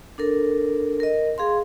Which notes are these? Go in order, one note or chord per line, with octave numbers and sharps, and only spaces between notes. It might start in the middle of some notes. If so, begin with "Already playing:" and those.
D4 A4 A#4
A#4 D#5
G#4 F5 C6